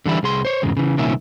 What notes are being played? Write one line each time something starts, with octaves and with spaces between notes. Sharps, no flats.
D3 E3 G3 E4
C2 G#4 C6
C5 C#5
E2 G#2 C#3 G#3
C#3 E3
C2 A#2 D#3 C#4 E5